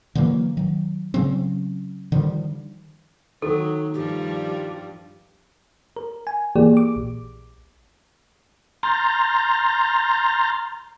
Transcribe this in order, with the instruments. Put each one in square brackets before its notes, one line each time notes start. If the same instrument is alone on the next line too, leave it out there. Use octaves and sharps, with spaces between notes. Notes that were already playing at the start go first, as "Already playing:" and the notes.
[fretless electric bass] D3 E3 F#3 A#3
D#3 F#3
C#3 F#3 C4
D3 D#3 F3 G3
[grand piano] D#3 [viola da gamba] F#3 [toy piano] A4
[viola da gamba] G2 F3 G3 [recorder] G4
[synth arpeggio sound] A#4
G#5
E3 A#3 G4 G#4 D5
D6
A#1
[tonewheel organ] A#5 C6 F6 G6 A6 A#6